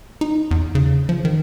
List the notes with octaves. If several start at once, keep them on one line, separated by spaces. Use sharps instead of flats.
D#4
E2
C#3
F3
D#3